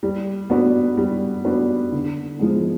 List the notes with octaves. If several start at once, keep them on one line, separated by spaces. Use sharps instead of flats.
G3
B3 D4 F#4 B4
G3
B3 D4 F#4 B4
D3
F3 G#3 B3